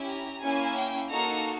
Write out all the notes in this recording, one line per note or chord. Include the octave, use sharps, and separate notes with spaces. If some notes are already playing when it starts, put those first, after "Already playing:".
Already playing: C#4 E4 G4
A#5
A#3 C#4 E4 G#5
G5
A#3 D#4 F#4 A4 A#5